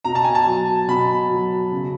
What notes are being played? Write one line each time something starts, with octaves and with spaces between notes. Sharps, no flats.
B2 A#5
A5
G#5
A5
F#3
B2 B5
F#3
C#3